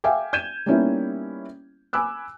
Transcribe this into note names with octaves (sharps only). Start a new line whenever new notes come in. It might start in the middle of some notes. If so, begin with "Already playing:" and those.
E5 F5 G5 G#5 D6
G6 G#6 D#7 E7
G3 A#3 B3 C#4 D#4 E4
G#5 B5 D6 E6 F#6